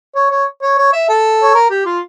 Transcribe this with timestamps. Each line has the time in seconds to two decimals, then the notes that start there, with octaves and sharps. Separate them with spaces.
0.15 C#5
0.30 C#5
0.62 C#5
0.78 C#5
0.93 E5
1.09 A4
1.43 C#5
1.54 A#4
1.70 G4
1.85 F4